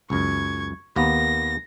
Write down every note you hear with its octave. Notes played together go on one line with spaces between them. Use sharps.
C#2 F#2 C#6 G#6
D#2 A#3 B3 A#6